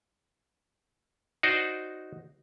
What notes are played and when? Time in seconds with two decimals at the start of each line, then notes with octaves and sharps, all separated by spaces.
1.43 D#4 F#4 C5 D5